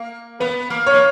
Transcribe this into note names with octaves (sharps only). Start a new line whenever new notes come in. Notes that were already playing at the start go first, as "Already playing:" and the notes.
Already playing: A#3
B3 B4
A#3
C#5
A#3